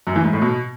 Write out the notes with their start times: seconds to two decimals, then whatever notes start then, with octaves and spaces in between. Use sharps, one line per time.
0.07 F#2
0.15 E3
0.24 G#2
0.33 A2
0.42 B2